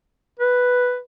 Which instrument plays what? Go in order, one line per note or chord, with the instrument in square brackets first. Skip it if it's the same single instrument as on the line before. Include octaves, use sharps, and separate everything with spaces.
[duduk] B4